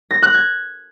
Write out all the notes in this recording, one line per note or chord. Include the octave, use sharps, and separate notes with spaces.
A#6
F#6
G#6